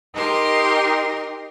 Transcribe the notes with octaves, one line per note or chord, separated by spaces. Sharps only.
D#4 G4 A#4 C6